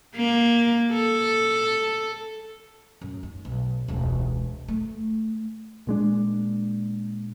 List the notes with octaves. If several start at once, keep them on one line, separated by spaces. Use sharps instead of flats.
A#3
A4
F#2
D#4
B1
E1 C#2
A3
A#2 G#3 D4